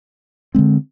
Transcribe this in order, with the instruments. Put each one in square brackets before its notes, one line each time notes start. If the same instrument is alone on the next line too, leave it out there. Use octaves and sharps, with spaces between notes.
[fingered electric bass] D3 G#3 C4